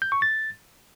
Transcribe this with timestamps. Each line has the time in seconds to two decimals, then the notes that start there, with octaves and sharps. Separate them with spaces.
0.02 G6
0.12 C#6
0.22 A6